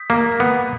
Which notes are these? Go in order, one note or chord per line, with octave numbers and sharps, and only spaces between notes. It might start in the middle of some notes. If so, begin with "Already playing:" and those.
Already playing: D#6 G6 B6
A#3
B3